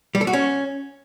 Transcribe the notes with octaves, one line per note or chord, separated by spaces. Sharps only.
G3
A4
F#4
C#4